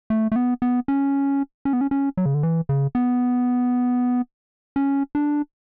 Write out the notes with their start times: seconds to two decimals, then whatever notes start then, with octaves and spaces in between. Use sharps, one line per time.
0.10 A3
0.32 A3
0.36 B3
0.62 B3
0.88 C#4
1.65 C#4
1.73 B3
1.81 C#4
1.91 C#4
2.17 F#3
2.26 C#3
2.34 D3
2.43 E3
2.69 C#3
2.95 B3
4.76 C#4
5.15 D4